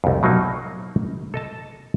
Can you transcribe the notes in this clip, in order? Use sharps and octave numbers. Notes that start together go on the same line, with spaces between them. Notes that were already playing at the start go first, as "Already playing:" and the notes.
C2 F2
B2 F#3 A#3 D#4
A4 D#5 A5